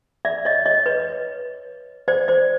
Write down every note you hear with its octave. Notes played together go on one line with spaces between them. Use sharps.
D5 E5
C#5 D#5
C#5 D#5
B4 C#5
C5 D5
C5 D5